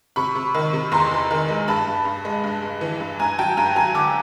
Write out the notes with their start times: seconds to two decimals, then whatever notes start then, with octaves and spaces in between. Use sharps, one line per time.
0.16 C3 B5 C#6
0.35 C3
0.54 D#3
0.73 C3
0.92 E2 A#5 C6
1.11 E2
1.31 D#3
1.48 G#3
1.68 G2 A5 B5
1.87 G2
2.05 G2
2.25 G#3
2.44 G2
2.62 G2
2.81 E3
3.00 G2
3.19 G2 G#5 A#5
3.39 F#3 G5 A5
3.57 G2 G#5 A#5
3.76 F#3 G#5 A#5
3.94 D3 D6 E6